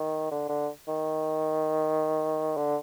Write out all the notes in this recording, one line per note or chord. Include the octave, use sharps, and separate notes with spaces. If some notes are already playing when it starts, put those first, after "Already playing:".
Already playing: D#3
D3
D3
D#3
D3